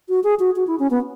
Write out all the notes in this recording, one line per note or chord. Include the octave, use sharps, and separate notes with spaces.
F#4
G#4
F#4
F#4
E4
C#4
B3